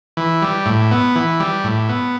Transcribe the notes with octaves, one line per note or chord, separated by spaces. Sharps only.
E3
G3
A2
B3
E3
G3
A2
B3